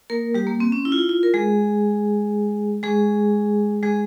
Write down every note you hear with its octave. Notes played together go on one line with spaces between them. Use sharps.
A#3 A#4
G3 G4
A#3
C4
C#4
E4
F4
E4
F4
A#4
G#3 G#4
G#3 G#4
G#3 G#4